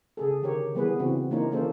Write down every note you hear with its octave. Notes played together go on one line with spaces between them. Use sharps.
C#3 G#4 A4
D3 D#3 G4 A#4 C#5
E3 G3 B3 G#4 B4
C#3 E3 C4 F#4
E3 A#3 D4 D#4 F4 C#5
D3 E3 A#3 C#4 A4 C5